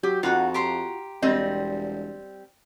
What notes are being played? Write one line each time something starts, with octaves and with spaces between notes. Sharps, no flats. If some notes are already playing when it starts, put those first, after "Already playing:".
F#3 G4
F2 D#4 F4 F#4 F#5
G4 A#5 C6
E1 G3 C4 D#5